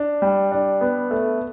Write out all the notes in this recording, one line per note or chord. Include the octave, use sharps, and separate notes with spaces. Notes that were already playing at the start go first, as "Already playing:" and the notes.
Already playing: D4
G3
D4
B3
A3